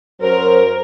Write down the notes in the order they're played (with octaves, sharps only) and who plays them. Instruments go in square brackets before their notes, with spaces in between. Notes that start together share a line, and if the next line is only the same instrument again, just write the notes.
[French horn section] F#2 F#3 C5 [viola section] A#4